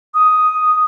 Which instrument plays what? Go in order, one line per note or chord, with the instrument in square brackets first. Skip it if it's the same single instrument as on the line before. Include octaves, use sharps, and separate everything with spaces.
[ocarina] D#6